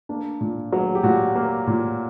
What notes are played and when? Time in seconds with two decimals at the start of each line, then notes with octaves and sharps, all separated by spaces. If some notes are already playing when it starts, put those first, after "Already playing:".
0.09 A#3 D4
0.41 A#2
0.73 F#3
0.95 G4
1.03 A#2 F#4
1.35 A#3
1.67 A#2